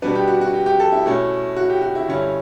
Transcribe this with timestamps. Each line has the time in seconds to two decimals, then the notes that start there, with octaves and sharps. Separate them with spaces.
0.02 B2 G3 B3 D4 B4
0.15 G4
0.28 F#4
0.41 F#4
0.54 G4
0.66 G4
0.80 A4
0.92 E4
1.06 B2 A3 C#4
1.56 F#4
1.70 G4
1.82 F#4
1.95 E4
2.08 G2 D3 G3 C#4